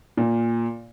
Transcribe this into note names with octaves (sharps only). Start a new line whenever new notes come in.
A#2